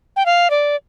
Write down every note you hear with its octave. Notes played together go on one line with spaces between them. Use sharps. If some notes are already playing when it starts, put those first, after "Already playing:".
G5
F5
D5